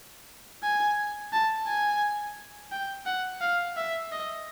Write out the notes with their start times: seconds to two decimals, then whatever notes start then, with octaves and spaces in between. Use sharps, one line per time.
0.63 G#5
1.32 A5
1.67 G#5
2.72 G5
3.06 F#5
3.41 F5
3.76 E5
4.12 D#5